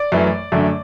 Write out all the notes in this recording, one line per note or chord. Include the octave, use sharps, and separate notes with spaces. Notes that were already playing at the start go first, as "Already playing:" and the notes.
Already playing: D5
F#2 E3 A3
F#2 D3 A3